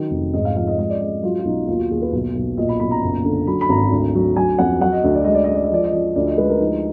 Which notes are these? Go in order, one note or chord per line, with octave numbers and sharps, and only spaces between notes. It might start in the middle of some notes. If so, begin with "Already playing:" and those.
Already playing: D#3 F#3
F1
G#2 D#5
F5
F3 F5
D#5
G#3 D#5
D5
G#3 D#5
F#3 F4
F4
B1 D#4
D#2 F4
F#4
D#2 G#4
B4
B1
B1
A#2 D#5
B5
B1 B5
A#5
F#1
D3
F#3 B5
B5
G#1 A#5
D2
F#3
F#3 G#5
F2 F#5
F#3 F#5
D#5
D2
D5
G#3 D#5
D5
G#3 D#5
D5
D#5
F3 D5
D#5
F3 D5
D2 D5
D#5
G#3 B4
A#4
F3 D#4